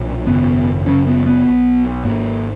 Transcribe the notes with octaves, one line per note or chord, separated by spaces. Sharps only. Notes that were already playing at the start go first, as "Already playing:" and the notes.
Already playing: B1 A#2
G#1 F#2 C#3 B3
F#1 F#2 C#3 C#4
B3
B3
B1 B2
G#1 G#2 A#3